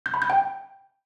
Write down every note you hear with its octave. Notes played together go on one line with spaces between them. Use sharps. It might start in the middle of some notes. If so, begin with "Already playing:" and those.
G6
B5
G6
G5